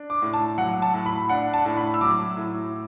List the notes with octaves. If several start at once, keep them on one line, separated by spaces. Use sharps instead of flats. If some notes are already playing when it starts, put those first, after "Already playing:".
Already playing: D4
D6
A2
A5
F#3 F#5
A5
A2
B5
D4 F#5
A5
A2
B5
E6
F#3 D6
A2